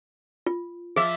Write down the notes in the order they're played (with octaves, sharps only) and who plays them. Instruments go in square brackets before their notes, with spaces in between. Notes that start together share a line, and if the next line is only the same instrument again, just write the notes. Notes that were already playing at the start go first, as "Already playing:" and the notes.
[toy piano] F4
[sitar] F3 E5 [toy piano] G#4